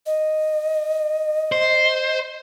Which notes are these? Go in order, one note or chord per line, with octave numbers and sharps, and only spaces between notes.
D#5
C5